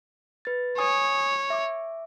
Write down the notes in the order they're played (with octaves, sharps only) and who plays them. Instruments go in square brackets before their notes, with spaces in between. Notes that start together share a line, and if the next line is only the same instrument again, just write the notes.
[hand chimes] B4 A6
[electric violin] C#5 [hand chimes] G#5 D#6
[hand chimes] E5 D6